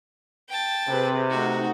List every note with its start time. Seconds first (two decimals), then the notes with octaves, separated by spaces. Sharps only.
0.49 G5 A5
0.88 C3 C4 G#4 B4
1.30 A3 D#4 F#4 F#5